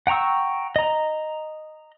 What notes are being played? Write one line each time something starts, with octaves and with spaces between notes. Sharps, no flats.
F#5 G5 A#5 C#6 E6
D#5 A#5